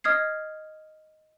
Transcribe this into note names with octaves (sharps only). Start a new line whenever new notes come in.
D#5 D#6 F6 G#6 C7